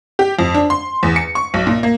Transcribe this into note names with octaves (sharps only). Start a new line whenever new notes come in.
G4
F2
D4
C6
E2
C#7
C#6
B1
A#2
A#3